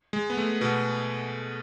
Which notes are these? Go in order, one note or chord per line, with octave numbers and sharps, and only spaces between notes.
G#3
B3
A3
B2 B3